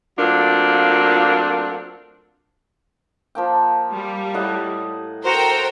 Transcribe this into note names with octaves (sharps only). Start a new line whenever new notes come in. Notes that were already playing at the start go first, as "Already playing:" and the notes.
F#3 A3 A#3 C4 D4 F4
F3 A#3 G5
G3
A2 D#5 F#5
F#4 A4 A#4 C5 G5 A#5